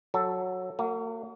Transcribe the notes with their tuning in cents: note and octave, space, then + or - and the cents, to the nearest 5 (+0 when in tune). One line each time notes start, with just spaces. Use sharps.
F#3 -10 A4 +0
A#3 -40 F#4 +0